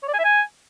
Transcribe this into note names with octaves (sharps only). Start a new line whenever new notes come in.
C#5
D5
G#5
E5
G#5